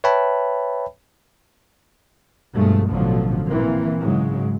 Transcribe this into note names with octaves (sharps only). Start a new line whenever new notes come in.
B4 C#5 E5 G5 A5 B5
G2 B2 F3 G#3 A3
A1 B2 D3 F3 F#3
A#2 E3 A#3 C4
G#2 C#3 F#3 G#3